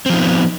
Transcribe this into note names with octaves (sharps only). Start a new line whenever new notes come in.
F3 B3 C4 D#4